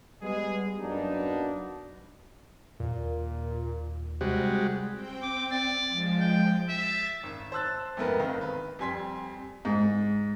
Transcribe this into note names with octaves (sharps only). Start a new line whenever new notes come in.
G3 G#3 B3 G#4
F#2 F#3 A#3 B3 D4 D#4
D#2 A#2
C3 G3 G#3 F#4
C4 G5
D6
D5
F3 G#3
G5
E5 A6
G#1
C5 A5 E6 F#6 A6
F2 G#2 A3 B3 A#4 B4
G1 D#3 C4 F5
B4
F2 G3 G#5 C6 B6
G#2